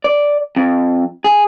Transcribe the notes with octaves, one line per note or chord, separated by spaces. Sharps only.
D5
F2
G#4